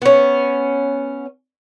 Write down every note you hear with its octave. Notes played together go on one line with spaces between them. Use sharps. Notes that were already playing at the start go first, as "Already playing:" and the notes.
B3 C#4